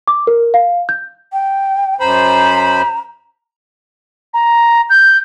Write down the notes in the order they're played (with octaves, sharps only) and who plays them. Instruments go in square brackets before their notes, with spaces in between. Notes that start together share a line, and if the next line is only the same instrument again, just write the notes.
[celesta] D6
A#4
F5
G6
[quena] G5
[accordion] F#2 C5 B5 [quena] A#5
[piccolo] A#5
G6